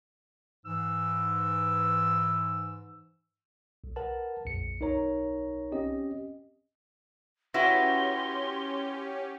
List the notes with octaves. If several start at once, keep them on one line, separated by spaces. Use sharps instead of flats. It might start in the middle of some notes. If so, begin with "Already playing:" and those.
G#2 E3 E6
B1
A#4 B4 F#5 A5
A#1 F2 C#7
B1 D#4 A#4 C#5 A#5
C4 C#4 G4 D#5
C#4 E4 F#4 G4 B4 F#5 C6 A#6